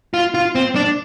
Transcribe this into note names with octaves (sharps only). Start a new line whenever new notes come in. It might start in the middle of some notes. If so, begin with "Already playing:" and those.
F4
F4
C4
D4